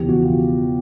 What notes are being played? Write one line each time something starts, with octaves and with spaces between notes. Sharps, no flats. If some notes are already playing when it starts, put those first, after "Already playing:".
Already playing: E1 E2 C#3 F3 G4
F#4
F4